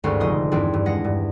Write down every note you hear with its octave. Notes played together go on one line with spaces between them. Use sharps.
G#1 D2 G2 C#4 C5
F1 D#5 C6
E2 G2 E3 C4 D4
G2
G#3 F#5 A#6
G2